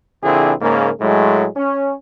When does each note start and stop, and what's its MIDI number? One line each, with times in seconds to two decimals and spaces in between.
0.23 0.53 34
0.23 0.53 50
0.23 0.53 60
0.23 0.53 64
0.23 0.53 68
0.61 0.90 44
0.61 0.90 49
0.61 0.90 58
1.00 1.47 45
1.00 1.47 54
1.00 1.47 56
1.56 1.93 61